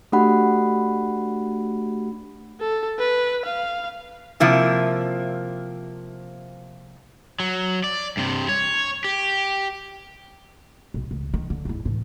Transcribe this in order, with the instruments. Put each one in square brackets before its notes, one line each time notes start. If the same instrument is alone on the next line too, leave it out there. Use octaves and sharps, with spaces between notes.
[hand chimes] A3 D4 F#4 G4 F#5 B5
[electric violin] A4
B4
F5
[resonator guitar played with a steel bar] C3 F3 A#3 E4
[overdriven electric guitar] F#3
D5
G2 C3
C#5
G4
[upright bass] B1
C#2
D#3
D3
G#2 E4
A2 E3